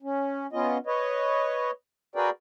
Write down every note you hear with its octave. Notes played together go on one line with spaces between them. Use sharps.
C#4
B3 C#4 F4 D#5
B4 C#5 D#5
F#4 G#4 A#4 B4 D5 G5